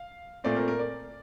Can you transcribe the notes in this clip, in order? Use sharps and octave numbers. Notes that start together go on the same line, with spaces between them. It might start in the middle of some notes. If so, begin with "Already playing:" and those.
Already playing: F5
A#2 A3 C4 D5
A#4
A#4
D5